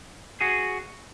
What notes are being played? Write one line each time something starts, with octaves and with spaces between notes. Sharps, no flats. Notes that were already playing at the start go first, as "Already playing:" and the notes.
F#4 G#4